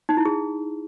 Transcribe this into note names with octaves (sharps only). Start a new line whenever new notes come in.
D#4
E4
G#4